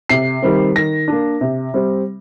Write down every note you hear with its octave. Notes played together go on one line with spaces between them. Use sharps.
C3 C7
D#3 G3 C4
D#3 A#6
A#3 D4
C3
G3 C4